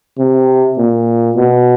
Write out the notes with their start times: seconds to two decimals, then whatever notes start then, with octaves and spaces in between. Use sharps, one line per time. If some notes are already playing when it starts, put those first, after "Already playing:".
0.19 C3
0.78 A#2
1.37 B2